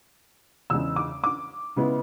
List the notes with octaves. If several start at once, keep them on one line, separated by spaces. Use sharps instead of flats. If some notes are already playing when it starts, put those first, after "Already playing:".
E2 C#3 G#3 E6
D6
D6
C#3 G#3 B3 E4